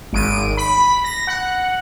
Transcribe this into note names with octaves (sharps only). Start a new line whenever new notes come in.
G#1 D7 D#7
B5
A#6
F#5